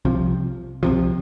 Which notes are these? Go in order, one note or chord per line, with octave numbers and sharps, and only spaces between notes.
C2 C3 F3
C2 C3 F3